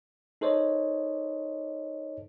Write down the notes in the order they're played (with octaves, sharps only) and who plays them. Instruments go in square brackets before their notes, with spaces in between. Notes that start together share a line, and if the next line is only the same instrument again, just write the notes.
[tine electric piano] D#4 A4 A#4 C5 C#5 D#5